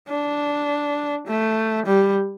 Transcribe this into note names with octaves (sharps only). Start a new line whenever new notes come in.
D4
A3
G3